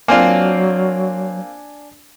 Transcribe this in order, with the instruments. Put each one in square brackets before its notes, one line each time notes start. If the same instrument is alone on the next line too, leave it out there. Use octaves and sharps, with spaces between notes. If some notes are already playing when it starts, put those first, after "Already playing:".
[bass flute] F#3 [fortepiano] A#3 C4 F4 [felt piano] D4 G#5